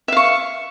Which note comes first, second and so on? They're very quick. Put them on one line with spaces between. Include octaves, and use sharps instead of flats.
E5 F5 C#6